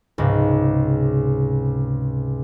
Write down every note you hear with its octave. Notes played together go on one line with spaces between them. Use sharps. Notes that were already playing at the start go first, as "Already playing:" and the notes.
C#2 G#2 C3